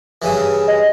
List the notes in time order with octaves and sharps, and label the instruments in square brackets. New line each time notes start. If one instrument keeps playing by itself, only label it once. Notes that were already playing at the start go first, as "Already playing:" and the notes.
[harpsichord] G2 C#3 E3
[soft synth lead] D#5